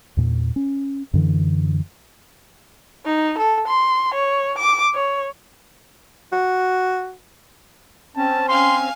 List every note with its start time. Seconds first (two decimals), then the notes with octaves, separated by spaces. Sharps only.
0.17 E2 A#2
0.56 C#4
1.14 F#2 D3 E3
3.05 D#4
3.38 A4
3.68 C6
4.14 C#5
4.58 D6
4.95 C#5
6.32 F#4
8.16 C4 C#4 A5
8.48 F5 G#5 C6